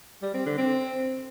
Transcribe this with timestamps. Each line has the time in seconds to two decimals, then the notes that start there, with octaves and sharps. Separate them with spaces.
0.22 G3
0.34 C4
0.46 D3
0.58 C4